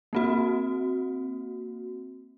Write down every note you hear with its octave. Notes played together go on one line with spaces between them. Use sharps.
A#3 C4 F#4